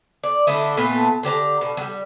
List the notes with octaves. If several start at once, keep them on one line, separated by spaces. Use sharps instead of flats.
D5
D3 A3 E4 D#5
A#2 A3 B3 B4
D3 G4 C5 A#5
B2
F#3 G3